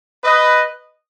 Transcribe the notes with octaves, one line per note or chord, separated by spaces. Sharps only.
B4 D#5